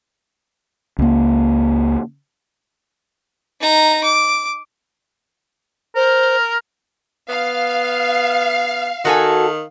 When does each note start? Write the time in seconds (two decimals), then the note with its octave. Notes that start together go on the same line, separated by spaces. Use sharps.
0.98 C#2 A#3
3.61 D#4 A#5
4.04 D6
5.96 A#4 C5
7.29 B3 F5
9.05 D#3 F#4 A4 G#5